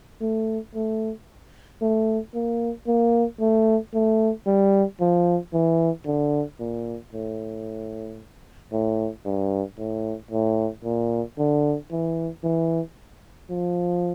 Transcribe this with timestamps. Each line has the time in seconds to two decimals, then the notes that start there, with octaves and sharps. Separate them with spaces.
0.21 A3
0.75 A3
1.82 A3
2.34 A#3
2.87 A#3
3.40 A3
3.94 A3
4.46 G3
5.00 F3
5.53 E3
6.06 D3
6.60 A#2
7.13 A2
8.72 A2
9.25 G2
9.78 A2
10.31 A2
10.84 A#2
11.38 D3
11.91 E3
12.43 E3
13.50 F3